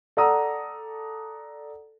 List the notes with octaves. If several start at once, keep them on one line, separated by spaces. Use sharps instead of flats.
A4 D5 F#5 A#5 D#6 E6